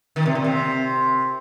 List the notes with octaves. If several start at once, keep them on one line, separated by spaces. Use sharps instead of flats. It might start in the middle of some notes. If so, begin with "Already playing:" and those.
D#3
C3
A#2
C3